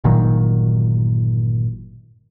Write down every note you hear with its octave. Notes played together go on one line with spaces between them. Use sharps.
G1 A#2 D#3 F#3